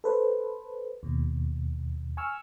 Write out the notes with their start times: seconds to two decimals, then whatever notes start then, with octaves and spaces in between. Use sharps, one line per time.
0.04 A4 B4 C5
1.03 D#2 B2
2.17 G#5 C#6 E6 F6